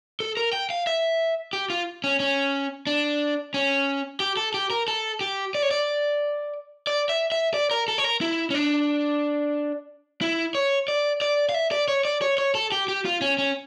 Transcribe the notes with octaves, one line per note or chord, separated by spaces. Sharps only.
A4
A#4
G5
F5
E5
G4
F4
C#4
C#4
D4
C#4
G4
A4
G4
A#4
A4
G4
D5
C#5
D5
D5
E5
E5
D5
A#4
A4
C#5
A#4
E4
C#4
D4
E4
C#5
D5
D5
F5
E5
D5
C#5
D5
C#5
C#5
A4
G4
G4
F4
C#4
C#4